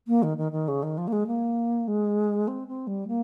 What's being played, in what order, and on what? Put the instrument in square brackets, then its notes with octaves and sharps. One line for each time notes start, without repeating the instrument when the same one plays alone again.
[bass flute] A#3
D#3
D#3
D#3
C#3
D#3
F3
A#3
G#3
A#3
G#3
C4
C4
G3
A#3